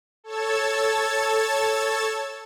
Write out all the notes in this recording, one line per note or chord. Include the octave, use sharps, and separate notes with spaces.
A4 C#5 A5 E6 G#6 A6